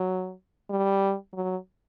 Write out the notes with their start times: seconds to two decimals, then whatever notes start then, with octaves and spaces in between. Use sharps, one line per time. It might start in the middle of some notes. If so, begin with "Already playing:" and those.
Already playing: F#3
0.70 G3
1.34 F#3